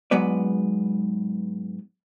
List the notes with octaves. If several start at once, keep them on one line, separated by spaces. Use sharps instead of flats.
G#2 F#3 G#3 B3 B4 D5